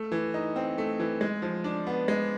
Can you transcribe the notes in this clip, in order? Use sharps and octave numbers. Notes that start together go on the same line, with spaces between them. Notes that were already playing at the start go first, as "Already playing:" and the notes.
Already playing: A3
E3
D#4
C4
A3
E3
G#3
F3
D4
B3
G#3